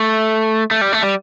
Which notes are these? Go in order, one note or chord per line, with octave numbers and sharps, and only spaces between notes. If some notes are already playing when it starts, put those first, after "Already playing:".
Already playing: A3
A3
G3
A3
G3